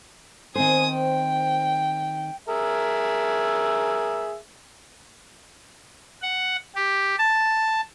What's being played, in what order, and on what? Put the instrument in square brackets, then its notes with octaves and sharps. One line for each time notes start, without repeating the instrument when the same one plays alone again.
[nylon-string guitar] D#3 C4 C5 [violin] G#5 D#6
[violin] G5
[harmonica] G#4 A#4 E5
[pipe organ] F#5
G4
A5